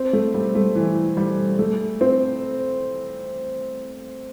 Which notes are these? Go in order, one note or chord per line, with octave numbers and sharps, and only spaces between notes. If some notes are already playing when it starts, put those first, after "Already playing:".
Already playing: C4
A3
G3
A3
E3
G3
A3
C4